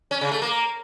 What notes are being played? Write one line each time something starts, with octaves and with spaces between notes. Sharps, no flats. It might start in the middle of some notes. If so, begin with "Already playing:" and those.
C#4
C#3
A3
A#3